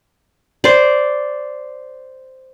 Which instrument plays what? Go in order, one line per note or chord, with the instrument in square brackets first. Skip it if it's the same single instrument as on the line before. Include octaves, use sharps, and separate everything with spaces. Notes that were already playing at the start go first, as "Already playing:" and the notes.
[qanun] C5 D5